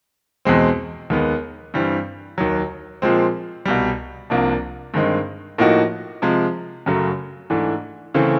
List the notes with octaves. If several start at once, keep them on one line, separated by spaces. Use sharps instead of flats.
E2 B2 G#3 C4
D#2 D#3 G#3 B3
G2 E3 G3 C4
D#2 D#3 F#3
A#2 F3 G#3 C4
C2 B2 G3
C2 C3 F3 A#3 D4
G2 D#3 G#3 C4 D#4
A2 F3 A#3 D#4 F#4
C3 F3 G#3
F#2 C#3 F#3 A3
G#2 E3 A3 D4
C#3 E3 A3 C4